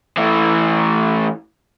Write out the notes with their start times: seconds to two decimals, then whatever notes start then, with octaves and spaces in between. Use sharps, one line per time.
0.17 E3 A3